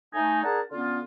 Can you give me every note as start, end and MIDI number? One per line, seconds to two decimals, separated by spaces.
0.14 0.43 57
0.14 0.43 63
0.14 0.43 80
0.44 0.60 62
0.44 0.60 68
0.44 0.60 70
0.44 0.60 78
0.44 0.60 81
0.44 0.60 82
0.72 1.00 50
0.72 1.00 59
0.72 1.00 61
0.72 1.00 65